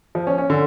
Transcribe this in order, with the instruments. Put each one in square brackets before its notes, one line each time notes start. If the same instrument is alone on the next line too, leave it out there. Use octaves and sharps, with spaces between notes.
[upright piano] F3
C#4
C#4
D3